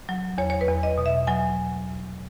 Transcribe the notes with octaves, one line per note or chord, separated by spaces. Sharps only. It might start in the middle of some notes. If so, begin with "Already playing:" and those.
F#3
E2 C#5
C#5
B4
E2
D#5
B2
E5
F#3 G#5